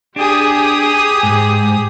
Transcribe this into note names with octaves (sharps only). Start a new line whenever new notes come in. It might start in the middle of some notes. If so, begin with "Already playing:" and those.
D4 G4 G#4 D#6
G#2